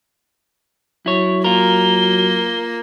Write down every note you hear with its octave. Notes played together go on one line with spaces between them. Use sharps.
F#3 E4 C#5
A#3 F4 A#4 G7